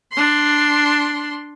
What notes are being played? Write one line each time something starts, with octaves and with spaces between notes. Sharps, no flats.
D4 C6